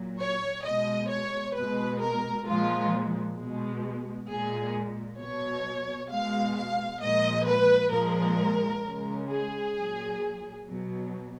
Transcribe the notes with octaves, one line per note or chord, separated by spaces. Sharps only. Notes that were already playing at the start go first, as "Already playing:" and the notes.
Already playing: A#2 F#3
C#5
B2 G#3 D#5
C#5
B2 G#3 B4
A#4
A#2 F3 G#3 F4
B2 G#3
A#2 G#3 G#4
B2 F#3 C#5
B2 G#3 F5
F5
A#2 F3 G#3 D#5
B4
A#2 F3 G#3 A#4
C#3 G#3
G#4
A#2 F#3
B2 F#3